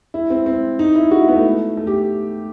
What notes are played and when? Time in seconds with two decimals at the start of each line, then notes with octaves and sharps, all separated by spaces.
0.14 E4
0.30 C4
0.46 C4
0.79 D#4
0.95 E4
1.11 F#4
1.19 E4
1.28 B3
1.36 A3
1.77 A3
1.87 G4